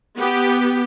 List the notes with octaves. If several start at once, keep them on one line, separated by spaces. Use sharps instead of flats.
B3 G4